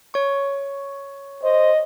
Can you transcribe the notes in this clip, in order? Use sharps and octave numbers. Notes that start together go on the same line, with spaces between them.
C#5 C#6
C5 D#5